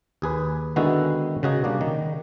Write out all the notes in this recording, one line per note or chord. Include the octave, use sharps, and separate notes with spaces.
D#2 G#4 B4
D3 D#3 G#3 B3 E4 F#4
C#3 F#4 D#5 A#5
G3 A#3 D4
D#3